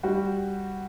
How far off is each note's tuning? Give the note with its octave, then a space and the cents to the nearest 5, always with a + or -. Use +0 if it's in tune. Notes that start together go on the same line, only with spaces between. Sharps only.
G3 +0 F#4 +0